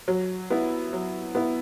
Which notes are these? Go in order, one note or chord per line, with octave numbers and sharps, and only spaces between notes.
F#3
B3 E4
F#3
B3 E4